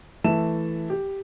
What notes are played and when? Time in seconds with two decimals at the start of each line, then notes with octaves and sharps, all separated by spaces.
0.24 E3 A3 E5 A5 E7
0.90 G4